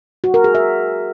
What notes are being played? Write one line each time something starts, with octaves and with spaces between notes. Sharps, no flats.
F#4
A#4
G#4
E5